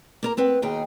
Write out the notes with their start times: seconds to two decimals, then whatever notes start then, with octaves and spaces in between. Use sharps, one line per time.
0.23 A#3 A#4 A#5
0.37 B3 C4 B4
0.62 D#2 B2 D#4 G#4 G5